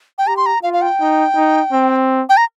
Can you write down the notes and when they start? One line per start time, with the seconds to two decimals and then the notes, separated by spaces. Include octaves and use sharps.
0.18 G5
0.27 G4 A#5
0.37 C6
0.46 A#5
0.63 F4 F5
0.73 F5
0.82 G5
0.99 D#4
1.36 D#4
1.72 C4
2.29 G5
2.37 A#5